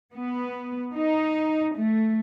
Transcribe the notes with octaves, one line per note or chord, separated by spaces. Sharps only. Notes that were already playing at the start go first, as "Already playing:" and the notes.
B3
D#4
A3